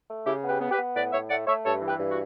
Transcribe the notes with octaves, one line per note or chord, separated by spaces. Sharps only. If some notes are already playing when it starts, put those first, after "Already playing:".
A3
C#3 E4 G4
B3
G4 B4
B3
G4 B4
B3
A2 B4 D5
A2 C#5 E5
A3 D5 F#5
A3 C#5 E5
G2 A4 C#5
E3
G4 B4
G2
F#4